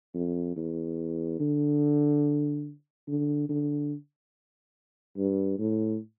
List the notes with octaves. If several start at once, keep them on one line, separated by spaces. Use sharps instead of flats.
F2
E2
D3
D3
D3
G2
A2